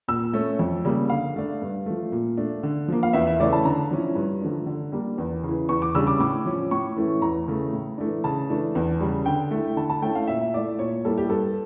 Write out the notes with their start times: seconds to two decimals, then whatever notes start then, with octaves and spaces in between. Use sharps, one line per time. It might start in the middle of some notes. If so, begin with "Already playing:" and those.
0.08 A#2 E6
0.33 A3 C#4
0.59 F2
0.85 C#3 G3 A#3
1.10 D3 F5
1.36 A3 D4
1.62 G2
1.86 F3 A3
2.12 A#2
2.37 A3 D4
2.63 D3
2.88 F3 A#3
3.03 F5
3.13 E2 E5
3.27 E5
3.40 C#3 E3 A3 C#4 D5
3.53 A5
3.65 D3 A#5
3.91 F3 C#4 E4
4.15 G2
4.41 D3 F3 A3 D4
4.66 D3
4.92 G3 A#3 D4
5.18 E2
5.43 C#3
5.48 E3
5.69 E2 C#6
5.82 D6
5.95 C#3 G3 D4 E6
6.07 D6
6.19 A2 D6
6.46 F3 C#4
6.71 A2 C#6
6.96 E3 A3 C#4 E4
7.21 E2 A#5
7.48 C#3 E3 A3
7.73 A2
7.98 E3 A3 D4
8.24 C#3 A5
8.49 E3 A3 D4
8.75 E2
9.00 C#3 G3
9.26 D3 G5
9.51 A3 E4
9.77 D3 A5
9.90 A5
10.02 A3 C#4 E4 G5
10.15 F5
10.27 A#2 E5
10.54 A3 E4 D5
10.79 A#2 C#5
11.05 G3 A#3 E4 A4
11.18 G4
11.29 G2 A4